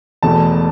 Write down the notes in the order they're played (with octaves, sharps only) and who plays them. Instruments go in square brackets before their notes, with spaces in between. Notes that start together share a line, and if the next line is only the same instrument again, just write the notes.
[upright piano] E1 E2 B2 A3 A5